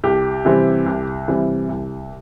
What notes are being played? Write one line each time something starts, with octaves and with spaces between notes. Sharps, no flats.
C2 G4
C3 E3 G3 C4
C2
C3 E3 G3 C4
C2